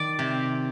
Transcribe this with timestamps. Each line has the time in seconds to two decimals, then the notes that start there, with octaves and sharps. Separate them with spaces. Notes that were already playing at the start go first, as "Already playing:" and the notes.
Already playing: D#3 D5
0.19 C3